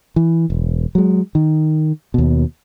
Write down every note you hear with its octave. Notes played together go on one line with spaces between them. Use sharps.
E3
E1
F#3 G#3
D#3
D#2 B2